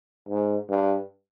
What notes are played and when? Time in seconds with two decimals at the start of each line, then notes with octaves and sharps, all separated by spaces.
0.29 G#2
0.69 G2